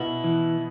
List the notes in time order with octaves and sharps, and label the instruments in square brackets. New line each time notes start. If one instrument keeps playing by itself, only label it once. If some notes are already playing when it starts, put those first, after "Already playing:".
Already playing: [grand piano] B2 B3 [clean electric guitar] E4
[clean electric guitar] E3